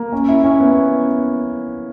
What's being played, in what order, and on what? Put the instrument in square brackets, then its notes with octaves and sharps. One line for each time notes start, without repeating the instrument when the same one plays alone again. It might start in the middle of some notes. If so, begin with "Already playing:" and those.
Already playing: [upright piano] A#3
[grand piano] C#4
E4
C#4
B3